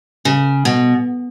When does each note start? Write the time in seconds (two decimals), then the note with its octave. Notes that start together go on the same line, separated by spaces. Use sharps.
0.25 C#3
0.65 B2